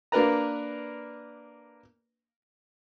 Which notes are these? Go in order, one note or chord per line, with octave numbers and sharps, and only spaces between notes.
A#3 D4 A#4 B4 A#5